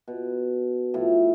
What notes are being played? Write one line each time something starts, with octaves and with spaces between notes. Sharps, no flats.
B2
A2 F3